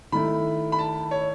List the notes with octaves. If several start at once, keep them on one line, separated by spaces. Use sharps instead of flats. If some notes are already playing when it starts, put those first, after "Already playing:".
D#3 A3 E4 B5
B5
A5
C#5